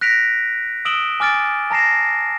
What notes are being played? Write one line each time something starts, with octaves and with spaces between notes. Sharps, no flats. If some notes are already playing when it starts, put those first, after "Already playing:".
F#6 A#6 B6 D7 F7
D#6 E6 D7 E7 F#7 G7
G#5 D6 F6 A6 D7
A5 A#5 A#6 C7 E7